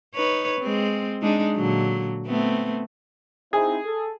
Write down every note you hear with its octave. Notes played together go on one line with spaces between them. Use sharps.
D#4 B4 C#5
G#3 C4
G#3 D4 D#4
A#2 D3 F#3
A3 B3 C4
C4 D#4 E4 G#4
A4